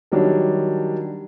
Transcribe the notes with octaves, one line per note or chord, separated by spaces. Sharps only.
D#3 F#3 G3 D4